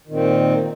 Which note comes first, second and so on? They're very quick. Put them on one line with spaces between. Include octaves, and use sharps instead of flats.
D#3 A#2 C4